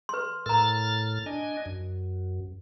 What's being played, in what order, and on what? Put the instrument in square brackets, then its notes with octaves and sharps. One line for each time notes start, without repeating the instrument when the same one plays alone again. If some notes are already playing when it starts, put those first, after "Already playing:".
[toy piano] B4 C6
[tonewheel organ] A2 F6 A6 [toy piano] A#4 A#5
[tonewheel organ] D4 D#5 G#5
F#2